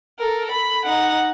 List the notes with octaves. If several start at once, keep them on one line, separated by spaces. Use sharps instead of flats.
A4 A#4
B5
D#4 F#5